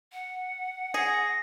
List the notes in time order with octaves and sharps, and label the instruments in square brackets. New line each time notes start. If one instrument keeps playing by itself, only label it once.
[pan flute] F#5
[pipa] G#4 [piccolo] A#6